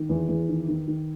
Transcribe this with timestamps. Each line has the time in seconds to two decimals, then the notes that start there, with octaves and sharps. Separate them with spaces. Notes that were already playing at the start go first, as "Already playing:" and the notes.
Already playing: D#3
0.09 E2
0.29 E2
0.49 D#3
0.68 D#3
0.88 D#3